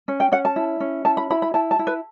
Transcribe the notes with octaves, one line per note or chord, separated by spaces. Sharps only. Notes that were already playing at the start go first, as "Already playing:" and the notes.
C#4
G5
C#4 F#5
A5
E4
C#4
E4 A5
B5
E4 B5
B5
E4 A5
A5
E4
B4